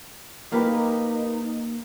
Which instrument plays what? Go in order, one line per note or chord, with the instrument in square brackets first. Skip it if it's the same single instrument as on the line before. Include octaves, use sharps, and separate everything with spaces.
[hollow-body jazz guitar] A#3 G4 [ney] D#4 [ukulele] A#4 B4